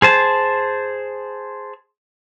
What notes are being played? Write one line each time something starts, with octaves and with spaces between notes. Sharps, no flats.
G#4 C5 A5